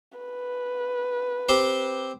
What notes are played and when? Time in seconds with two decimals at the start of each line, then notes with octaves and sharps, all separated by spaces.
0.19 B4
1.49 C4 G4 C5